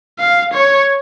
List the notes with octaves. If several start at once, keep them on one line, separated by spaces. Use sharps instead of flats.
F5
C#5